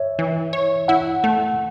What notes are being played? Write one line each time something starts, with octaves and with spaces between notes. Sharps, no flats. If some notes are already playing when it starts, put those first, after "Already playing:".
Already playing: C#5 E5
E3
C#5
E4 F#5
A3